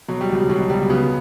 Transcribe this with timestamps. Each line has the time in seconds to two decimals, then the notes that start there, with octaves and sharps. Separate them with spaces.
0.08 B2 F#3
0.21 G3
0.29 C#2 F#3
0.49 B2 F#3
0.69 C#2 G3
0.89 C#3 B3